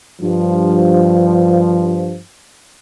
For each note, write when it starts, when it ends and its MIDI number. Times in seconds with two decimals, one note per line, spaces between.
0.21 2.18 43
0.21 2.18 53